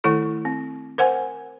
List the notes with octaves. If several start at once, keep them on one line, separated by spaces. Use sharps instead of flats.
D#3 A3 E4 A4 C#6
C4
A#4 C5 F#5 G#5